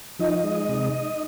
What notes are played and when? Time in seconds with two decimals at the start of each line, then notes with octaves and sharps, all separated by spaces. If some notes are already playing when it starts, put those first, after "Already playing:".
0.19 F3 D#4 D#5
0.44 G#3
0.69 C3